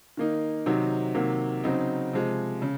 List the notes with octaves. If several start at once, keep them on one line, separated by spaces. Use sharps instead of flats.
D#3 A#3 D#4
C3 D#3 F#3 C4 D#4
C3 D#3 F#3 A#3
C#3 F#3 C4 D#4
C3 F3 G#3
C#3